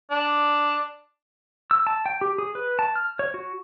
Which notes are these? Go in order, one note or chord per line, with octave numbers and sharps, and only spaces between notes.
D4
E6
A5
G5
G4
G#4
B4
A5
F6
C#5
F#4